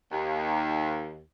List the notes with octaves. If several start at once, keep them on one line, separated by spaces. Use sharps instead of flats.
D#2